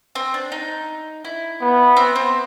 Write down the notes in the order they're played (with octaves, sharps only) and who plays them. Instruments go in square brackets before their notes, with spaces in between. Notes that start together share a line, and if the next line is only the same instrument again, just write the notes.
[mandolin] C4
D4
D#4
E4
[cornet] B3
[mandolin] C4
C4